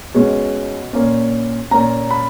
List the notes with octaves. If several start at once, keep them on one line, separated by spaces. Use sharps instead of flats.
B2 G#3 C#4
A#2 A#3 C#4
A#2 A#3 C#4 A#5
B5